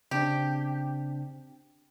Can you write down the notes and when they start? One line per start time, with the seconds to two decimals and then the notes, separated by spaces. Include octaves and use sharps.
0.11 C#3 C4 D4 G4